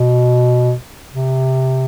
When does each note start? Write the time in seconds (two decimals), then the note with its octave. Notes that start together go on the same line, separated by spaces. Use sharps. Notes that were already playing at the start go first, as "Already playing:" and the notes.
Already playing: B2
1.13 C3